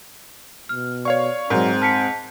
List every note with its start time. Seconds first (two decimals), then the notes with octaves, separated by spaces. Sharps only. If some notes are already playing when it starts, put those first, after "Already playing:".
0.69 B2 F6
1.05 C#5 D5 F5 C#6
1.50 G#2 F#3 C4 A#4
1.82 A5 F6 B6 C#7